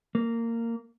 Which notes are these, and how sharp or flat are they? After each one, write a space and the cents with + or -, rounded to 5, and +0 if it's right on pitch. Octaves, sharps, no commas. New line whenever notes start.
A#3 -15